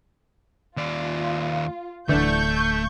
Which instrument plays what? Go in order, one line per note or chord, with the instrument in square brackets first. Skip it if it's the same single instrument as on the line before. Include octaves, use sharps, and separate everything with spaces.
[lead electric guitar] D#2 D5 [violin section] F4
[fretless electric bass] D1 D3 [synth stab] E3 D4 [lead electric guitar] A3 [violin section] C#6 G6